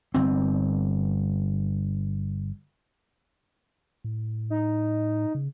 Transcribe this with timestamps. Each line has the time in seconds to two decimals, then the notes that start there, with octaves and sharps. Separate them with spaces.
0.14 G1 C4
4.04 A2
4.50 D#4
5.35 C#3